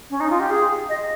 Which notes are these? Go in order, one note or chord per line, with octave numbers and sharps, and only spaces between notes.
C#4
D#4
F4
G4
G#4
D#5